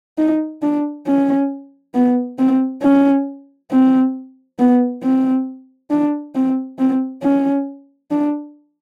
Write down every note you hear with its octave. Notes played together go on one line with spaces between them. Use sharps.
D#4
D4
C#4
B3
C4
C#4
C4
B3
C4
D4
C4
C4
C#4
D4